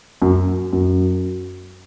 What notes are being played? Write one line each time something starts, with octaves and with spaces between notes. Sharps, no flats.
F#2
F#2